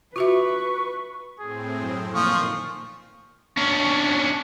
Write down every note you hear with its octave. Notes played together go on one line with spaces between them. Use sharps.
F4 F#4 B4 E5 C#6
A2 C4 G#4
F#2
A#2 D#3 F3 A3 G#5 C6 C#6
C#4 D4